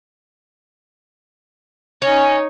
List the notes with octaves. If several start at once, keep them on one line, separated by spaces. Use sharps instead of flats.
C#4 D#4 C#5 A#6